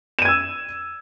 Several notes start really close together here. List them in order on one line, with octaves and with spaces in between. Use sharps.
E7 D#7 G#6 E6